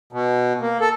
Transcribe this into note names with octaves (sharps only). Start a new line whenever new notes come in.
B2
A#3
A4